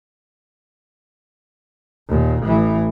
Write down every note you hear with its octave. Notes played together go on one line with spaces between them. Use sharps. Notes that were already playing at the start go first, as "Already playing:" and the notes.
D#2 A#2
A1 E3